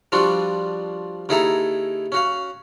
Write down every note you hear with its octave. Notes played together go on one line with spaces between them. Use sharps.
F3 G3 D4 F4 F#4
D#2 D#4 E4 G#4 A4 A#5
C#4 F#4 F5